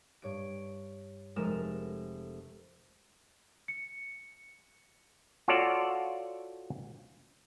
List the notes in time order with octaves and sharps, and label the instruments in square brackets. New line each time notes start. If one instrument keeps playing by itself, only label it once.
[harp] G2 C#5 D7
F1 G#3 A4 A#4 F6 E7
[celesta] C#7
[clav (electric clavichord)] F4 F#4 A4 C#5 D5 F5